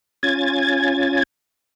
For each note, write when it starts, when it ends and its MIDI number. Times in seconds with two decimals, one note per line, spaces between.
0.23 1.23 61
0.23 1.23 65
0.23 1.23 80
0.23 1.23 92
0.23 1.23 93